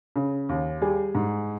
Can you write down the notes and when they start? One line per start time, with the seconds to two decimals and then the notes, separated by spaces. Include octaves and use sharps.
0.16 C#3
0.49 D#2
0.81 G3 G#4
1.15 G#2